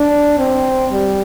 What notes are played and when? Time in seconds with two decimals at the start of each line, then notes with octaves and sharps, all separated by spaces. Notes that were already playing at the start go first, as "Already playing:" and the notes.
Already playing: D4
0.39 C4
0.92 G3